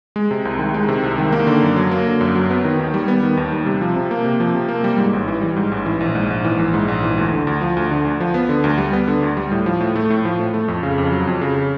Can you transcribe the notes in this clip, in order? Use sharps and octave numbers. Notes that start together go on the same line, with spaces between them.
G#3
C3
C2
D#3
G#3
C3
C2
D#3
A#3
D3
F#2
F#3
A#3
D3
F#2
F#3
B3
D#3
D#2
G3
B3
D#3
D#2
G3
C3
F3
C3
A#3
C3
F3
C3
A#3
G3
G#2
A1
E3
G3
G#2
A1
E3
A#1
G#2
A#1
E3
A#1
G#2
A#1
E3
D2
D3
D2
F3
D2
D3
D2
F3
B3
D3
D2
G3
B3
D3
D2
G3
A2
F3
A2
A3
A2
F3
A2
A3
F2
C#3
F2
F#3
F2
C#3